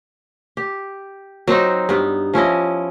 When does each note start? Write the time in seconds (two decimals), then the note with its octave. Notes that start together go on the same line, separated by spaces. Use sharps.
0.57 G4
1.47 F#3 C4 D#4 F#4
1.89 G2 B3
2.34 F3 C#4 E4 D#5